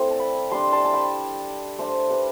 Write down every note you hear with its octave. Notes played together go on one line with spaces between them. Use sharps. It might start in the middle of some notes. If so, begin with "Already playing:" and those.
Already playing: A3 C4 E4 D5 E5
A5
G5 B5
G3 D4 A5 C6
A5 C6
A5
G5 B5
A3 D4 A4 C5
G4 B4